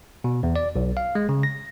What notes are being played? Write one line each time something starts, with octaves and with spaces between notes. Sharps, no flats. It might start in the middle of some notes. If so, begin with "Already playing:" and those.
B2
E2
D5
B1
F5
G#3
C#3
A#6